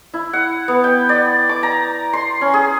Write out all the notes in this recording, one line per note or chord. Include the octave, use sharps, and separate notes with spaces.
E4
F#5
B3
G5
D5
D6
A#5
C6
C#4
G#4